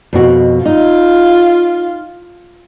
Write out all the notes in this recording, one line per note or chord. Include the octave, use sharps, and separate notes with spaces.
F2 B2 F#4
D#4 F4